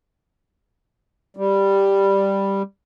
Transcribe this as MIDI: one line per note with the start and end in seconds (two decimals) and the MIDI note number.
1.37 2.62 55